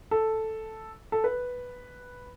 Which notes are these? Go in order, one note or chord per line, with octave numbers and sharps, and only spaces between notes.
A4
A4
B4